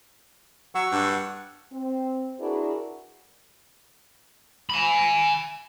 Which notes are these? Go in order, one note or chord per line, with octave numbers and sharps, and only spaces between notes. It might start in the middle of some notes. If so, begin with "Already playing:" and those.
F#3 F#5 C#6 E6
G2
C4
D4 E4 F#4 G#4 A#4 B4
G#5 B5